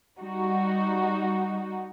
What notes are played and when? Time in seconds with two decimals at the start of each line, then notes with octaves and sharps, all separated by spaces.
0.19 G3 D#4 F#4